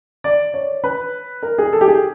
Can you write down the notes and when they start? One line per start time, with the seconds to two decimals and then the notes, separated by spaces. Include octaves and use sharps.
0.24 D5
0.54 C#5
0.84 B4
1.43 A#4
1.58 G#4
1.73 A4
1.81 G4
1.88 G#4